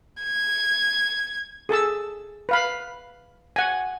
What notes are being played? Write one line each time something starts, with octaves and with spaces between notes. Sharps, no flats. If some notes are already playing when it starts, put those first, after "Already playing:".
G#6
G#4 A4 A5 E6
B4 F5 B5
F#5 G#5